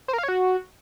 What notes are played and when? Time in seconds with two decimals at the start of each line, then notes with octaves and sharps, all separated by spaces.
0.08 C5
0.13 A#4
0.18 F5
0.23 C#5
0.28 F#4